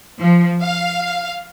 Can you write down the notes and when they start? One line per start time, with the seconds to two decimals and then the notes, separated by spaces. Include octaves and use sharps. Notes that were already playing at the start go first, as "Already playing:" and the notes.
0.19 F3
0.61 F5